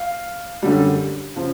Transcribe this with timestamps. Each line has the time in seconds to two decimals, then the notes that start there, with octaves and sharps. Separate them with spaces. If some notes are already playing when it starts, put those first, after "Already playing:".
Already playing: F5
0.62 F#2 D3 G3
1.36 C#3 F3